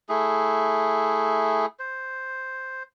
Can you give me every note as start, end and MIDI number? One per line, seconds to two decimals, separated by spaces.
0.09 1.66 57
0.09 1.66 64
0.09 1.66 68
1.79 2.83 72